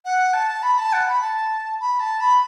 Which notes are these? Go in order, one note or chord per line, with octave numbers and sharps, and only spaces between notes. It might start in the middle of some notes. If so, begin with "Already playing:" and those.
F#5
A5
B5
A5
F#5
B5
A5
B5
A5
B5